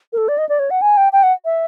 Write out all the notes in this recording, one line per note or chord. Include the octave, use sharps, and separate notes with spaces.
A#4
A4
D5
D#5
D5
C#5
F#5
G#5
G5
G5
F#5
E5